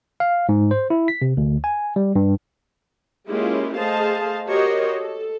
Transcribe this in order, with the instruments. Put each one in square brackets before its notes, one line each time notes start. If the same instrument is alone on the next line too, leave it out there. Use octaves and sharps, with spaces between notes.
[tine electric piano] F5
G#2
C5
E4
B6
C3
D2
G#5
G3
G2
[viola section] G#3 A#3 C#4 E4 F4 G4
A3 G#4 C5 D#5 F5 A5
F#4 G4 A#4 C5 C#5 D#5
A4